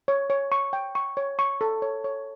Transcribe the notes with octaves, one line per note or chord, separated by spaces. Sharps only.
C#5
C#5
C#6
G5
C#6
C#5
C#6
A4
C#5
C#5